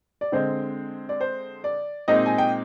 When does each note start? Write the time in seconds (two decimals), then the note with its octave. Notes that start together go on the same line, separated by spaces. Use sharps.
0.21 D5
0.32 D3 G#3 C4 C5
1.09 D5
1.21 C5
1.64 D5
2.08 A#2 G#3 C4 D#4 D#5
2.26 G#5
2.38 G5